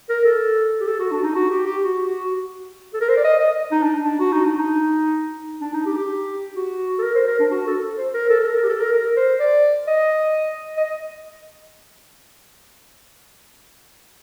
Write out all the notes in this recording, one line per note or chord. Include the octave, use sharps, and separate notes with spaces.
A#4
A4
G4
A4
F#4
D4
D#4
F#4
G4
G4
F#4
F#4
A4
A#4
C5
D5
D#5
D#5
D#4
D4
D4
F#4
D#4
D4
D#4
D4
D#4
G4
G4
F#4
A4
A#4
C5
A#4
D4
F#4
A4
C5
A#4
A4
A4
A#4
A#4
G4
A4
A#4
A#4
C5
D5
D#5
D#5